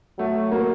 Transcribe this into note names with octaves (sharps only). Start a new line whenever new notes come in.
F#3 A3
A#3